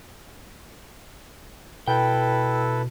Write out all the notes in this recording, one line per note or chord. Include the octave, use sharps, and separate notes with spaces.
B2 E4 A4 B4 G5